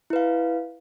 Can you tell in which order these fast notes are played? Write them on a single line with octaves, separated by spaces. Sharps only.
E4 B4 F5